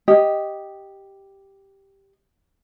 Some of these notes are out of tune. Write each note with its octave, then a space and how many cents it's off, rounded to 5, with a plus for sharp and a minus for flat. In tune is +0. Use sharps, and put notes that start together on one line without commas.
G4 +0 D#5 +0